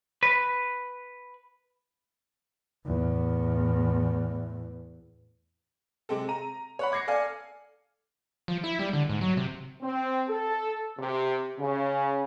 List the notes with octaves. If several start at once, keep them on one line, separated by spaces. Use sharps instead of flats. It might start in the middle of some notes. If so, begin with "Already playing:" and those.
B4
E2 A2
C3 G#3 C4 A4
A#5 D#7
C#5 F#5 B5
D6 G#6 A#6 C7 C#7
A4 D5 F5 G#5
F3
E4
G3
D3
G#2
F#3
C3
C4
A4
C3
C#3